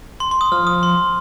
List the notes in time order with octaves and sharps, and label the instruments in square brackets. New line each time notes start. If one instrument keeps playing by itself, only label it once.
[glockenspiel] C6
C6
D#6
[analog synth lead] F3 [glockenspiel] F6
[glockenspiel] D#6
C6